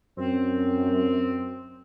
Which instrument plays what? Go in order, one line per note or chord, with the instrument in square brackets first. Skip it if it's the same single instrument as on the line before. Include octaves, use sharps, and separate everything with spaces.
[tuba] F#2 [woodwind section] C4